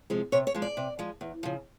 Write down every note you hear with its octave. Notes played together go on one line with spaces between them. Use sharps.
C3 F3 G#3
C3 C#5
C#5
F3 G#3
D5
C3
F3 G#3
E2
C#3 F3